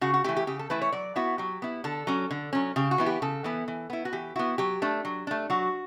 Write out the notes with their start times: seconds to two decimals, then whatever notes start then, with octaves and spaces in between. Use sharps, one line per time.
0.01 C#3 F#4
0.14 F#4
0.24 E3 A3 E4 G4
0.36 G4
0.47 C#3 G4
0.59 A4
0.70 E3 A3 E4 B4
0.82 C#5
0.92 F#3 D5
1.16 B3 E4 F#4
1.38 F#3 G4
1.62 B3 E4
1.84 D3 A4
2.07 F#3 C#4
2.31 D3
2.53 F#3 C#4
2.76 C#3 G4
2.91 F#4
2.98 E3 B3 E4
3.06 G4
3.22 C#3 A4
3.44 E3 B3 E4
3.68 E3
3.90 B3 E4
4.05 F#4
4.13 E3 G4
4.36 B3 E4 F#4
4.58 F#3 G4
4.82 A3 D4
5.05 F#3
5.27 A3 D4
5.50 F#3 F#4